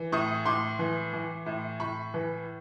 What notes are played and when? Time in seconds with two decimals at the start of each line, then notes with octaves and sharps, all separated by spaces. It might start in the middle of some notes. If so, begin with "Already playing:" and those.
Already playing: E3
0.12 A2 C#6 D#6
0.46 A2 C6 D6
0.79 E3
1.13 E3
1.46 A2
1.80 A2 B5 C#6
2.14 E3